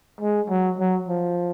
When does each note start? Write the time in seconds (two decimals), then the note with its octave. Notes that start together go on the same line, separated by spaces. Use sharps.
0.21 G#3
0.50 F#3
0.78 F#3
1.09 F3